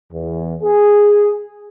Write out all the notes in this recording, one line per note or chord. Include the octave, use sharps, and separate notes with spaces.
E2
G#4